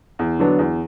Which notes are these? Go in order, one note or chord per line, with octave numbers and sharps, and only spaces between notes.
E2
D3 F#3 B3 D4
E2